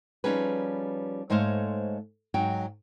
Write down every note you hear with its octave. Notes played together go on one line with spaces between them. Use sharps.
F3 G3 C#4 D#4 G#4 B4
G#2 G#3 A3 C5 C#5 F5
G#2 F#3 D#4 F#4 G5